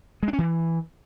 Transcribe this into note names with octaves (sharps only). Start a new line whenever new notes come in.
G#3
D4
C#4
E3